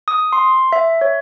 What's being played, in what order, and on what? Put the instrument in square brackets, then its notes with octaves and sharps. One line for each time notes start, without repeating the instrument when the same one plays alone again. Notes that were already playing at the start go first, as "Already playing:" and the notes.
[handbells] D#6
C6
E5
C#5